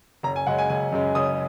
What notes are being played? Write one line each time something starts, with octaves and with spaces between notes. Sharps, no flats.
F#1 A#5
G#5
F#2 C#3 G#3 F#5
G#5
F#1 G#5
F#2 C#3 G#3
F#1 D#6